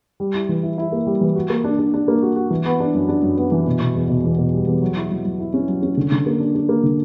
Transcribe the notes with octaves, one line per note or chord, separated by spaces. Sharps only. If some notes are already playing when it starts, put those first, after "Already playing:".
G3
E4
E3
E4
E4
A#3
G3
E3
F#4
A#3
D4
D4
D4
A#3
F#4
F#4
E3
B3
D4
F#2
D4
F#2
B3
E3
B2
B2
E2
B2
E2
B2
G3
E2
F#3
E4
F#3
F#3
E4
C#4
F#3
C#4
D3
D3
A#3
D4
D4
A#3
D3